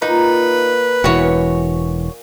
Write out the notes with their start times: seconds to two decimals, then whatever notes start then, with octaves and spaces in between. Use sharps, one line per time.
0.02 A#2 A#3 D#4 B4
1.04 E1 E3 F#4 C#5 G#5